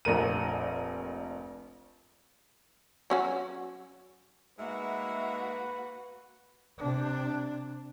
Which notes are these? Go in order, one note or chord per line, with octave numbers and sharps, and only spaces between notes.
F1 A#1 A#4 D#7
F#3 C#4 F#4
G#3 A#3 D#4 F#4 B4 E5
C3 D4